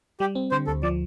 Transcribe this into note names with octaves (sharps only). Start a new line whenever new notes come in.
G3 G4
C4
D3 C5
D2 A4
F3 D5